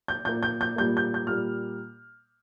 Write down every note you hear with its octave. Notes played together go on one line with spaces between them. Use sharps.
G6
A#2 A#3 G6
G6
G6
A#2 G3 A#3 G6
G6
G6
A#2 G3 A#3 F6